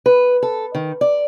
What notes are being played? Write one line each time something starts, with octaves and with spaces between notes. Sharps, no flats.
B4
A4
D#3
D5